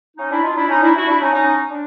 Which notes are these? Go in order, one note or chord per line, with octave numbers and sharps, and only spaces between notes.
C#4 D#4
D4 E4
D#4 F4
D4 E4
C#4 D#4
D4 E4
E4 F#4
D4 E4
C#4 D#4
C#4 D#4
D4